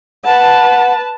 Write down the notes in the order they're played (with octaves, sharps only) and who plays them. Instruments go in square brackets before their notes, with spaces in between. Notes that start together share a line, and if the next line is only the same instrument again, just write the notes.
[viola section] B4 A5 [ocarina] F#5